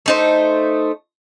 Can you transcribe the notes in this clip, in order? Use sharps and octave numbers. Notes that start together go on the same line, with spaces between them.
A3 D#4 C5